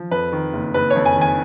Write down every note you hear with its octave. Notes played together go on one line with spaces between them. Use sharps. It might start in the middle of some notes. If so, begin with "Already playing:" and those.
Already playing: F3
F2 B4
D#3
F#1
F#1 B4
C#5
F2
G#5
D#3 G#5